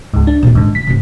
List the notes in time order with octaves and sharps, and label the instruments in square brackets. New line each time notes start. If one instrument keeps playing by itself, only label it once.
[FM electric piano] C#2 G#2
D4
[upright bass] D#2 A#2
[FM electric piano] G#2 D3 [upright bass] D4
[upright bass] D3 [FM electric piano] B6
[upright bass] G#2 C#3